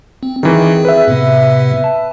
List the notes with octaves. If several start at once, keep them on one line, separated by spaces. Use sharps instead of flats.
C4
D#3 E3 C4 G#4
B4 E5
A2 C3 B3
A5